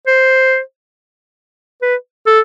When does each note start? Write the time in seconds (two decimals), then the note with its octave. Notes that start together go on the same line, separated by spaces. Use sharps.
0.07 C5
1.82 B4
2.26 A4